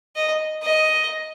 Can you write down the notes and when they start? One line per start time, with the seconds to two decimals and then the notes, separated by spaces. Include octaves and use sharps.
0.16 D#5
0.63 D#5